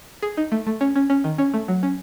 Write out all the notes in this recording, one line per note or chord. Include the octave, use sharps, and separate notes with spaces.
G#4
D#4
A3
A3
C#4
C#4
C#4
D#3
C#4
A3
F#3
C#4